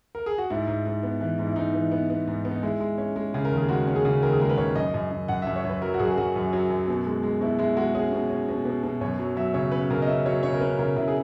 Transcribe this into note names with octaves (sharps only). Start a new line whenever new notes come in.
A#4
G#4
F#4
G#2 E4
G#2
G#2
B3
E3
G#2
E4
G#2 D#4
E3
B3
B3
G#2
B3
D#4
G#3 E4
G#3
C#4
G#3
C#3
A#4
D#2
G#4
G#3 F#4
C#4
G#4
C#3
D#2 A#4
G#4
G#3 A#4
B4
C#3 C#5
F#2 D#5
F#2
F#2
F#2 F#5
F#2 E5
C#5
F#2
B4
F#3 A#4
F#4
F#2 G#4
G#4
F#2 F#4
F#2
F#3
F#2
B2
G#3
G#3
B2 E4
G#3 E4
G#3 F#4
C#4 G#4
B2
C#4
B2
B2
B2
F#2 C#5
F#3
F#3 E5
C#3 C#5
C#4 B4
C#3 A#4
D#5
C#4 E5
F#3 C#5
C#3 C#5
A#4
C#4 B4
C#3 A#4
C#3 E4
G#4